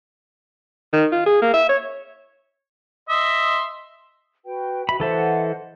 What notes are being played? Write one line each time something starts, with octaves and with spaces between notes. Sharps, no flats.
D#3
F4
G#4
A#3
E5
C#5
D#5 E5 C6
F#4 B4 G5
F#4 D#5 E5 B5
E3 A4 C5 D#5 E5 F#5